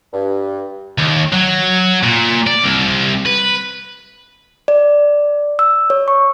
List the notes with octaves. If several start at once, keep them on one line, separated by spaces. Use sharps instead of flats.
G2
D#2
F#3
A#2
D5
C2
B4
D5
E6
C#5
C#6